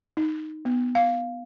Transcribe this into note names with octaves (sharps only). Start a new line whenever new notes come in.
D#4
B3
F5